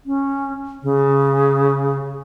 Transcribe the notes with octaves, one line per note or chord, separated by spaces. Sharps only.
C#4
C#3